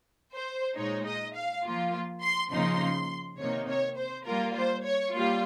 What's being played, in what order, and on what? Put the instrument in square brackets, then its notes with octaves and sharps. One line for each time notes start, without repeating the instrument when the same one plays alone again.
[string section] C5
A#2 G#3 D#4 C#5
D#5
F5
F3 A#3 F4
C6
C#3 F3 A#3 D#4 C6
C3 D#3 A#3 D#4 C#5
C#5
C5
G3 A#3 F4 A#4
C5
C#5
G3 A#3 F4